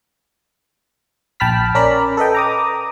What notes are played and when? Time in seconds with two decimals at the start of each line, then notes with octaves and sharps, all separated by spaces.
1.40 A#1 G5 A5 B5 F6 B6
1.75 C#4 A#4 D5 B5
2.17 A4 B4 D#5 G5
2.35 A#5 D6 D#6